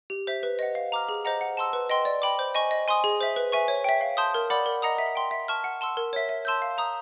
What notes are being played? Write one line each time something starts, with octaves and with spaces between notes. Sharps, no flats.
G4
C5 E5
B4
D#5 F#5
F5
A#5 D6 F6
G#4
C5 D#5 F#5 A#5
F#5
A5 C6 E6
B4
D#5 G5 C6
D5
G5 B5 D6
C5
D#5 G#5 C#6
D#5
G#5 C6 D#6
G#4
C5 E5
B4
E5 G#5 C#6
C#5
E5 G5
F5
A5 C6 D#6 G6
A#4
D5 F#5 B5 D6
A#4
D#5 F#5 A#5 D#6
E5
G5 C6
E5
A5 C#6 F6
F#5
A5 C6 E6
A#4
C#5 E5
E5
A5 C6 E6 G6
F5
A#5 D#6